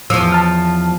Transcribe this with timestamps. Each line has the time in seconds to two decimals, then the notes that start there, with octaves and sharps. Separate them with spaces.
0.10 E2 F3 E6
0.32 A5 F6